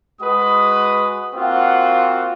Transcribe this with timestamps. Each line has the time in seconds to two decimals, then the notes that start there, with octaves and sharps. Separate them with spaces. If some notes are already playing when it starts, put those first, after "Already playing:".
0.21 G#3 F#4 B4 D#6
1.34 A#3 C4 F4 F#4 F#5